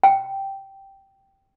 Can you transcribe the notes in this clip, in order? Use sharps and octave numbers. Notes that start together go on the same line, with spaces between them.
G5